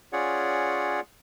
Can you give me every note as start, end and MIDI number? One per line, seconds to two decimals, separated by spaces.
0.13 1.00 61
0.13 1.00 65
0.13 1.00 68
0.13 1.00 73
0.13 1.00 74
0.13 1.00 78